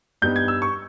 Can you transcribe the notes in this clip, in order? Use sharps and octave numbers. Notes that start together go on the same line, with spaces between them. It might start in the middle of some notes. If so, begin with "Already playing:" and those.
G2 G3 B3 D#4 G6
G#6
E6
C#6